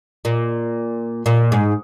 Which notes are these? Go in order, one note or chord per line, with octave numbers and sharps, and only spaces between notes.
A#2
A#2
G#2